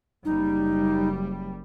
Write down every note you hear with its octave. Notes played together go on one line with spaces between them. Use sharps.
F#1 G3 D#4